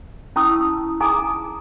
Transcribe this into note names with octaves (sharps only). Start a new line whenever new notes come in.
C#4 E4 A5 C#6 D#6 E6
D#4 G#4 G#5 A#5 D6 D#6